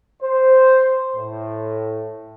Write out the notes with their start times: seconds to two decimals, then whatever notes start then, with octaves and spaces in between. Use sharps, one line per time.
0.23 C5
1.16 A2